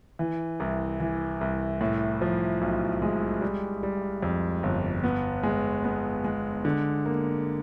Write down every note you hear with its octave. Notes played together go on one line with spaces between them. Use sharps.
E3
C2
E3
C2
A2
F3
B1
G#3
G3
G3
F2
G1
B3
G#3
B3
G#3
D3
A#3